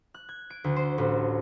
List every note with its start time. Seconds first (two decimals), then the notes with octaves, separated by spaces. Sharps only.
0.14 F#6
0.29 G#6
0.50 D7
0.64 D2
0.76 C5
0.98 A1